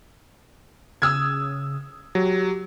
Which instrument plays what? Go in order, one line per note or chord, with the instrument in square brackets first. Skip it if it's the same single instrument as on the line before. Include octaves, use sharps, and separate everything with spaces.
[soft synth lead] C#3 [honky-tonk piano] D#6 E6 G#6
[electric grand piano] F#3 [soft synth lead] G4